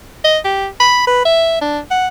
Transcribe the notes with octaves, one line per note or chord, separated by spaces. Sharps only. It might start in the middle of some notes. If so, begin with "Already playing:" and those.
D#5
G4
B5
B4
E5
D4
F#5